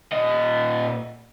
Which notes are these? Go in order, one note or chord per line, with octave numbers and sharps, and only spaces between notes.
A#2 D#5